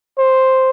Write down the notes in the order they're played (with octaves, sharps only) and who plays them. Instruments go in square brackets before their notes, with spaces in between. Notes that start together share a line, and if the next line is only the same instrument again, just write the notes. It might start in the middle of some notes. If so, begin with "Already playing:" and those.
[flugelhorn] C5